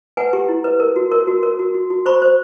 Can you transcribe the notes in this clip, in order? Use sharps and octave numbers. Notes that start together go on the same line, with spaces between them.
B4 F#5 G#5
G4
E4
B4
A#4
F#4
A#4
F#4
A#4
F#4
F#4
F#4
C5 B5 C#6
C5